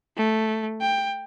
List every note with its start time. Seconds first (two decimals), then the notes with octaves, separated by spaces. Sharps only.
0.17 A3
0.81 G5